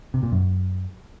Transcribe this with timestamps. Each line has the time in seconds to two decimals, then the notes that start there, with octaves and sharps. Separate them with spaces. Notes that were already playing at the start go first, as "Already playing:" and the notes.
0.14 C3
0.23 A#2
0.32 F#2